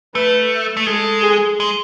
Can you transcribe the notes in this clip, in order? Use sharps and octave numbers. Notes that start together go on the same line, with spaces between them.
A3 B4
A3
G#3 A4
G#4
G#3